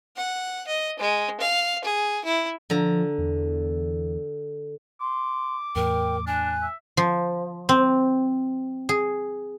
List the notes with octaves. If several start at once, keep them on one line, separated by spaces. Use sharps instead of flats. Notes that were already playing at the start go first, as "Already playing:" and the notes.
F#5
D#5
G#3
F5
G#4
E4
D3 F3 A#5
E2
C6 D6
E2 A2 A#4 G5
D4 G#5 F#6
E5
F3
C4
G#4